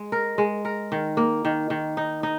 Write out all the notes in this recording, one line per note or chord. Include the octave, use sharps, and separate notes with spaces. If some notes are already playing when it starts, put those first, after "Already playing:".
Already playing: G#3
A#4
G#3
A#4
D#3
A#3
D#3
D#3
D#4
D#4